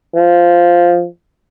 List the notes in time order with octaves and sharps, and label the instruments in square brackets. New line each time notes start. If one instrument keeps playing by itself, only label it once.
[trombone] F3